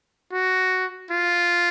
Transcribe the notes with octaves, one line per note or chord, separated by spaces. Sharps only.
F#4
F4